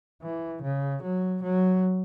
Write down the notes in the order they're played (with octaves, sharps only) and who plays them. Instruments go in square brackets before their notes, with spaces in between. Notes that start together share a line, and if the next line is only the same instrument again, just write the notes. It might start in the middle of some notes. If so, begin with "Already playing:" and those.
[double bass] E3
C#3
F#3
F#3